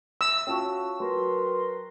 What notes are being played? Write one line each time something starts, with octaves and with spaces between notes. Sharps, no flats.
E6
C#4 F4 F#4 G5 A5 C#6
F#3 A#4 B4 C6